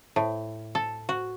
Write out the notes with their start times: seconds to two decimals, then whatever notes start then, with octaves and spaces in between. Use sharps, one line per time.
0.16 A2
0.75 A4
1.09 F#4